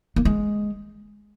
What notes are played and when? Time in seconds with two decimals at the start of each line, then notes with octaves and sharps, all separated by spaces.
0.16 A#3
0.25 G#3